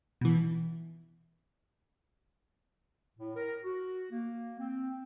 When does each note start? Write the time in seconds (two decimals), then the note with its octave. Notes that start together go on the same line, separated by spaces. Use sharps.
0.21 B2 E3
3.18 A2
3.36 A#4
3.64 F#4
4.11 A#3
4.60 C4